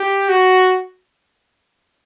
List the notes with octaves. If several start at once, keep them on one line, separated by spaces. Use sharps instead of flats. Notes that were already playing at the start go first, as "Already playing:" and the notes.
Already playing: G4
F#4